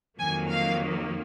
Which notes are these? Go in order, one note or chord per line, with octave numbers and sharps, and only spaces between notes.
F2 D#3 F#3 A#3 G#5
F5